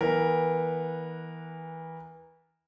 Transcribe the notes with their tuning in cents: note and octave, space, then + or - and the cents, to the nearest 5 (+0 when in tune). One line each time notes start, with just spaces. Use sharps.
E3 -20 B3 -20 A#4 -5